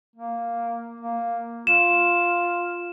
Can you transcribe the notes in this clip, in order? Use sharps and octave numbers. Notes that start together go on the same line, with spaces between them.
A#3
A#3
F4 E7